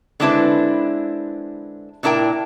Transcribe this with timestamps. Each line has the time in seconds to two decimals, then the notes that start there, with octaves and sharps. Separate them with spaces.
0.20 D3 G#3 C4 D4 E4 B4
2.03 A#2 D4 E4 A#4 G5